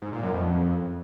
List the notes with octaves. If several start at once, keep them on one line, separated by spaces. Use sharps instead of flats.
G#2
A#2
F#2
F2